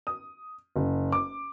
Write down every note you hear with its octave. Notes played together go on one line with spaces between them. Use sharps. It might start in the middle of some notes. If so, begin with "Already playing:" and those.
D#6
F#1
D6